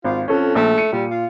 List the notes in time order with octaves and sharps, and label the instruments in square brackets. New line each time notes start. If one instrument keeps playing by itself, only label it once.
[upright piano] G#1 [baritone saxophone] F4
[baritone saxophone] F2 [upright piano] C#4 A4
[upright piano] A#1 [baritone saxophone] A3
[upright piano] C#7 D#7
[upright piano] A#2 [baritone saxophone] G3
[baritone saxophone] F4